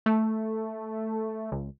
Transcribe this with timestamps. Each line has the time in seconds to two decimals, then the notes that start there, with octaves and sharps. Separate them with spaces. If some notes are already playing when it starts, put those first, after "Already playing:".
0.06 A3
1.52 C#2